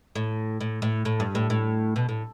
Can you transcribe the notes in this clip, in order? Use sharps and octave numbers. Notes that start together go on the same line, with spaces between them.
A2
A2
A2
A2
G2
A2
A2
B2
A2